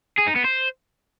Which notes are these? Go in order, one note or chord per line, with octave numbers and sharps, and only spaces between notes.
G#4
D#4
B3
C5